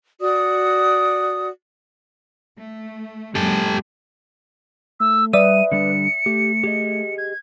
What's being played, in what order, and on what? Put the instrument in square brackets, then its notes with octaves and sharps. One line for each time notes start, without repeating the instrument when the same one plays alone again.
[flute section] F#4 D5 D#6
[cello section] A3
[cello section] F#2 A#2 G#3 [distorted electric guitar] G4 A4
[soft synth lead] A3 [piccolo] E6
[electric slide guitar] G3 [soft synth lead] B4 [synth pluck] D5 E5 D#6 [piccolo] D#7
[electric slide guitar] D3 G3 D4 [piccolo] C#7
[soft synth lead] A3 [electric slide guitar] G4
[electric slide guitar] G4 G#4 D#5
[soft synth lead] G#6